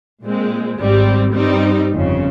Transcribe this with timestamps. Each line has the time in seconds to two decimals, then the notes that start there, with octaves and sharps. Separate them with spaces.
0.23 A#2 G#3 C4
0.79 G#1 G#2 G3 C4
1.35 G2 G3 C4 D#4
1.92 G1 F2 C#3